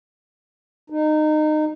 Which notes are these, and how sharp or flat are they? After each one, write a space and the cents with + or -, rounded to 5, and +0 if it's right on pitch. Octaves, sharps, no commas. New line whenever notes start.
D#4 -20